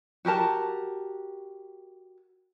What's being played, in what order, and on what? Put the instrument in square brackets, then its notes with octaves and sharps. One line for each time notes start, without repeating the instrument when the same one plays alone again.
[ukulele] F#4 G4 A#4 A5